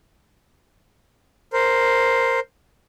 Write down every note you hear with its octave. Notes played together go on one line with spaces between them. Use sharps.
A#4 C5